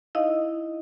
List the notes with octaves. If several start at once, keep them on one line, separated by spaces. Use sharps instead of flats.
D#4 E4 D#5 F5